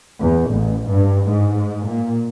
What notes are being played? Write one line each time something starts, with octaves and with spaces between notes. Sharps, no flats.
E2
A1
G2
G#2
A#2